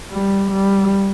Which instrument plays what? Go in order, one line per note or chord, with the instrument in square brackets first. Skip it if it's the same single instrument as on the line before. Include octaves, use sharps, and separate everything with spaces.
[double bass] G3
G3